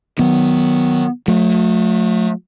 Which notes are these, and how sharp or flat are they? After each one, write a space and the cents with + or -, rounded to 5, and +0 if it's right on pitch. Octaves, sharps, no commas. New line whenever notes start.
D#3 +0 F#3 +0 B3 +0
F#3 -45 A3 +0